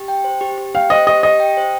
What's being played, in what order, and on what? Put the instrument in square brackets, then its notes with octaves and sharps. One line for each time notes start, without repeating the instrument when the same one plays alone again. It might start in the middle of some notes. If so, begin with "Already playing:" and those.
Already playing: [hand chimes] G4
G5
C5
G4
G4
[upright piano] F5 [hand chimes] G5
[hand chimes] C5 [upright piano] D#5
[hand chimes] G4 [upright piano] D#5
[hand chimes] G4 [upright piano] D#5
[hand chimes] G5
C5